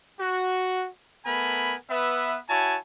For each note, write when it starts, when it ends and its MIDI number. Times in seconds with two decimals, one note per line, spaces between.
0.19 0.87 66
1.25 1.75 57
1.25 1.75 59
1.25 1.75 70
1.25 1.75 80
1.25 1.75 83
1.88 2.38 59
1.88 2.38 71
1.88 2.38 76
2.49 2.76 64
2.49 2.76 66
2.49 2.76 73
2.49 2.76 80
2.49 2.76 81